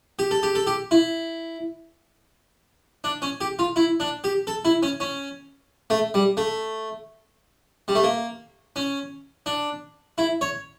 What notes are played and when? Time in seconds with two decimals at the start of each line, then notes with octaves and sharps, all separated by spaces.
0.19 G4
0.31 A4
0.43 G4
0.55 A4
0.67 G4
0.91 E4
3.04 D4
3.22 C#4
3.41 G4
3.59 F4
3.76 E4
4.00 D4
4.24 G4
4.47 A4
4.65 E4
4.83 C#4
5.00 C#4
5.90 A3
6.14 G3
6.37 A3
7.88 G3
7.95 A3
8.04 A#3
8.76 C#4
9.46 D4
10.18 E4
10.41 C#5